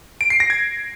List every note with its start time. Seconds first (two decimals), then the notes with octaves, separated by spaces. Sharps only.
0.21 D7
0.30 C7
0.40 A#6
0.50 G#6